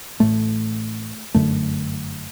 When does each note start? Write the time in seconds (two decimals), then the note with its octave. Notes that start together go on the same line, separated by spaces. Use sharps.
0.20 A1 A2 A3
1.35 G1 F#2 D3 A3